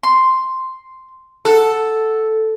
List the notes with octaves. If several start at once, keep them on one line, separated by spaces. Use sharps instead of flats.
C6
A4 F#5